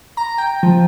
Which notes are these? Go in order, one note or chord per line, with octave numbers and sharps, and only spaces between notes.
A#5
G5
F3